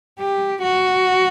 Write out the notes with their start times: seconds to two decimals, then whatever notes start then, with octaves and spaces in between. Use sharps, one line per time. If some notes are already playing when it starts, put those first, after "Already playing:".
0.20 G4
0.62 F#4